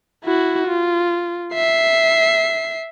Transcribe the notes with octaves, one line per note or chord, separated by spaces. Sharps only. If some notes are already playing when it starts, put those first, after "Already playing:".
E4 F#4
F4
E5 C7